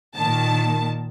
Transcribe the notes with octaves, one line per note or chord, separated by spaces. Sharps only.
A#2 D#3 A5